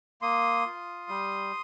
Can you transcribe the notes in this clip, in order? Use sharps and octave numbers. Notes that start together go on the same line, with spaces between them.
A#3 C6 D#6
F4
G3